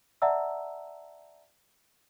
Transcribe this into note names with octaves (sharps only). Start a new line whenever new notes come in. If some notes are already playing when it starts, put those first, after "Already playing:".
D5 E5 F#5 A5 A#5 E6